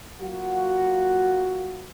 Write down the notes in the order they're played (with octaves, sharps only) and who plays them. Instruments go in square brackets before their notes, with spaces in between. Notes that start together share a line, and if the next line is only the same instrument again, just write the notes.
[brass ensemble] F#3 A#3 F4 F#4